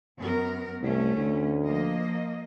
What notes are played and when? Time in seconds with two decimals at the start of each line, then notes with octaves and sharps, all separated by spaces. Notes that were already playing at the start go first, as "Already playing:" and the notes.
0.19 F#2 B3 A#4
0.83 C2 A3 C#4
1.16 D2
1.64 F3 A#3 D#5